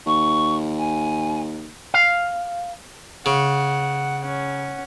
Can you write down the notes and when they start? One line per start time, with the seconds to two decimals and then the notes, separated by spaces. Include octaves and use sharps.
0.06 D#2 C#6
0.78 G#5
1.94 F5
3.26 C#3 F#5
4.21 C#4 F#5